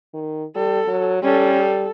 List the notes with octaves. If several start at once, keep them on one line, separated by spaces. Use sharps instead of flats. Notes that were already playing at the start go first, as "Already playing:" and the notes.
D#3
G3 A4
F#3
G3 C#4 A4
A4